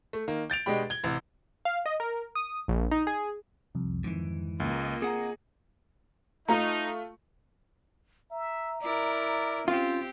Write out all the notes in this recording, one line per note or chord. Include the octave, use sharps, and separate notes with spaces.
A3
D#3 A#3
G6 A6 D7 F7
B2 G#3 D4 G4 G5 B5
G#6 G7
A1 C3
F5
D#5
A#4
D#6
A#1
D#4
G#4
C2 F2
F2 G#2 D#3 E3
C#2 A#3 F4 D#5
C4 G#4 F#5 A#5 C#7
A3 D#4 F4 A#5
E5 A#5
E4 A#4 D5
C4 C#4 F4 G4